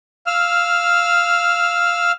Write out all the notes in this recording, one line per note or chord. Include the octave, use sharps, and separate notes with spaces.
F5 E6 F6